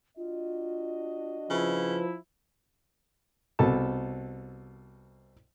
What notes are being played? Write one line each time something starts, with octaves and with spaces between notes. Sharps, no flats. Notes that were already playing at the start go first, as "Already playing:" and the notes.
D4 F4 F#4 D#5
C#3 F3 E4 B4
C2 B2 A4 A5